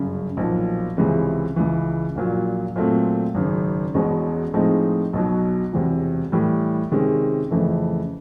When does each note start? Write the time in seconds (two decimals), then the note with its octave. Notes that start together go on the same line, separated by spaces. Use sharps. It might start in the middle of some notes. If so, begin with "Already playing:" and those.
Already playing: G1 F#2 C#3
0.37 B1 A#2 F3
0.97 C#2 C3 E3 G#3 C#4
1.56 C#2 C#3 E3
2.16 A#1 A#2 F#3
2.76 A#2 F#3 A3 C4
3.35 G#1 F#2 C#3
3.94 E1 E2 B2 G#3 C#4
4.54 A2 F3 G#3 C4 D#4
5.13 B1 B2 F#3
5.73 E1 E2 C3
6.32 A2 E3 G3
6.92 C3 D#3 G#3 C#4
7.51 F2 C#3 E3 A3